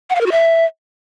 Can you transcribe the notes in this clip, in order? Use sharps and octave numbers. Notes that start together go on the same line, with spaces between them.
F#5
F5
A#4
F#4
E5